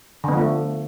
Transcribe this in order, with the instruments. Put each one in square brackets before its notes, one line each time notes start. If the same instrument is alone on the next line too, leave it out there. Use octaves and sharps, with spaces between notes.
[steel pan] D3
B3
F3
A3